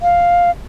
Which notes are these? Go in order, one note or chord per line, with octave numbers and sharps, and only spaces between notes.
F5